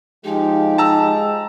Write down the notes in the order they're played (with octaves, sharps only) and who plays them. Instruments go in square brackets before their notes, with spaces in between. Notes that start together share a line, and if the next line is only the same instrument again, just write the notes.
[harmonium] F3 G4 [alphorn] G#3 [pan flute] D#4
[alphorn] G#3 [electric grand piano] A5 A#5 E6